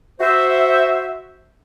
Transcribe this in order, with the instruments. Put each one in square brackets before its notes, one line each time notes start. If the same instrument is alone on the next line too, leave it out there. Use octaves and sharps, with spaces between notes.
[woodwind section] F#4 C5 E5